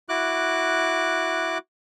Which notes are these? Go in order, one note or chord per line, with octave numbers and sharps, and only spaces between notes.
E4 F#4 D6 F#6